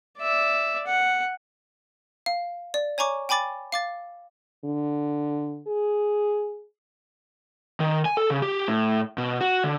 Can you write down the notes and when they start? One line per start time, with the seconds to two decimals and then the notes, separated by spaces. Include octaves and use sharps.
0.18 D5 E5
0.87 F#5
2.26 F5
2.74 D5
2.98 C#5 G#5 A#5 C#6 D6
3.29 G5 G#5 B5 D6 A6
3.72 F5 D6 A6
4.65 D3
5.67 G#4
7.80 D#3
8.06 G#5
8.17 A4
8.30 C#3
8.42 G4
8.68 A2
9.18 B2
9.41 F#4
9.64 D3